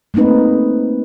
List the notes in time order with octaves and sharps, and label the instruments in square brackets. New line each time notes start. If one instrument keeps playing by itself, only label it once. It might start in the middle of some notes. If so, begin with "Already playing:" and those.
[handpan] A3 A#3 C4 D#4 B4